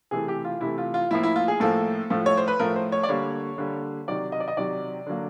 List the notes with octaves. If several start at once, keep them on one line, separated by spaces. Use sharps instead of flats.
C3 E3 A3 G#4
G4
F4
C3 E3 A3 E4
F4
F4
A2 F3 A#3 E4
E4
F4
G#4
A2 F3 A#3 A4
A2 F3 A3
C#5
C5
B4
A2 F3 A3 A#4
C5
C#5
D5
D3 G3 A#3 C#5
D3 G3 A#3
C3 D#3 F#3 D5
D#5
D5
D#5
C3 D#3 F#3 D5
D3 F#3 A#3